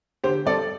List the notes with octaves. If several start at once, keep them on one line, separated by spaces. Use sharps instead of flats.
D3 G4 C5
G3 C4 A4 D5